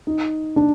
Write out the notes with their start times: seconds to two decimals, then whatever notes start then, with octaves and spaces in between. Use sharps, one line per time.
0.07 D#4
0.56 D4